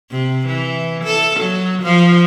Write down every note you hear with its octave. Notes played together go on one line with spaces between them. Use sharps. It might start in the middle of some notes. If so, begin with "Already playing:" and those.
C3
E3
A4
F#3
F3